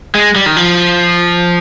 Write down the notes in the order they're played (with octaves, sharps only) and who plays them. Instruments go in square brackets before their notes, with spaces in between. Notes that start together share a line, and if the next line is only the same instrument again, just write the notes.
[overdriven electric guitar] G#3
G3
D#3
F3